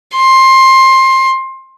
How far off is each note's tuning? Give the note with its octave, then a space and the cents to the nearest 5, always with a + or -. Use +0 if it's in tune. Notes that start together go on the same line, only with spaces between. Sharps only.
C6 +20